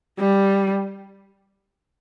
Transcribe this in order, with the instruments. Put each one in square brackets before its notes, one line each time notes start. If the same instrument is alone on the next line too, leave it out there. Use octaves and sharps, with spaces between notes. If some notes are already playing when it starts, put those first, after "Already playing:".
[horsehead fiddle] G3